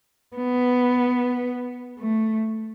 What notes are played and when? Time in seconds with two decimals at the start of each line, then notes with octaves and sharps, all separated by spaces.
0.37 B3
1.99 A3